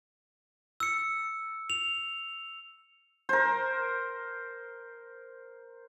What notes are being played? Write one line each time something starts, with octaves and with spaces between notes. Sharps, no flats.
E6 C#7
F7
A#4 C5